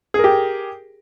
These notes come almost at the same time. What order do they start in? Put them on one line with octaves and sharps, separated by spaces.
G#4 A#4 G4